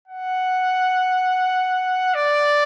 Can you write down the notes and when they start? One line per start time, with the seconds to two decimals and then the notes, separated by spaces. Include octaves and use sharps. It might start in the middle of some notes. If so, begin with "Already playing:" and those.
0.08 F#5
2.14 D5